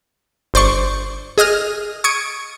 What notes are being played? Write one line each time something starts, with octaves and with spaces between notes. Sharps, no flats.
G1 C5 D5 C#6
G#4 D#5 D#6 F6
C#6 D#6 G#6 C#7 D7